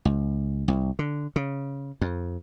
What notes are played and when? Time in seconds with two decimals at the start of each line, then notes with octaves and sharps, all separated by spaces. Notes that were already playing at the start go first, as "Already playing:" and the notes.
0.05 C#2
0.68 C2
0.99 D3
1.36 C#3
2.01 F2